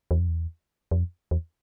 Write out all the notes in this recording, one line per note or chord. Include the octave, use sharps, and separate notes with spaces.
E2
F2
E2
F2
E2